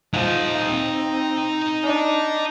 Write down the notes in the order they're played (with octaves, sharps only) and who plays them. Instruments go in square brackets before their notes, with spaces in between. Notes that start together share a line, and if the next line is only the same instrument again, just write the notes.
[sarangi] F3 [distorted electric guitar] D#4 F#5
[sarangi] C4
D4